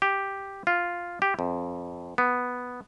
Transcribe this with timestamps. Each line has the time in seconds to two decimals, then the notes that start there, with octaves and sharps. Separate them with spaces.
0.02 G4
0.67 F4
1.22 G4
1.39 F2
2.18 B3